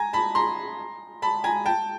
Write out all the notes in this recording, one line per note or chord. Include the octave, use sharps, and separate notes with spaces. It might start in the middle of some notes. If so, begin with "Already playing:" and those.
Already playing: G#5 A#5
A5 B5
A#5 C6
A5 B5
G#5 A#5
G5 A5